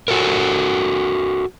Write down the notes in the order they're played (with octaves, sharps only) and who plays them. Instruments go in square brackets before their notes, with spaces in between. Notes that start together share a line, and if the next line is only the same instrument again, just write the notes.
[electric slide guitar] F#4 A4 A#4